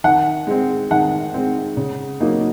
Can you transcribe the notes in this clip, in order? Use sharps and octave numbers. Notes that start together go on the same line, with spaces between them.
D#3 F#5
G#3 C4
D#3 F#5
G#3 C4
C#3
F#3 A#3 D#4